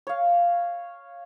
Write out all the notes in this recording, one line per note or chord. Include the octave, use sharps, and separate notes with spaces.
C#5 F5